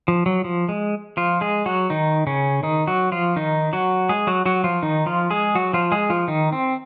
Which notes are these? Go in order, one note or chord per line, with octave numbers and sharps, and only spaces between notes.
F3
F#3
F3
G#3
F3 F4
G#3 G#4
F#3 F#4
D#3 D#4
C#3 C#4
D#3 D#4
F#3 F#4
F3 F4
D#3 D#4
F#3 F#4
G#3 G#4
F#3 F#4
F#3 F#4
F3 F4
D#3 D#4
F3 F4
G#3 G#4
F#3 F#4
F3 F4
G#3 G#4
F3 F4
D#3 D#4
C4